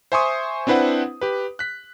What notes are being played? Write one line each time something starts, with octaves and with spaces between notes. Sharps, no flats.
C5 E5 G#5 C6 C#6 D#6
C4 D4 E4 B4 C5 F#5
G4 B4
F#6 B6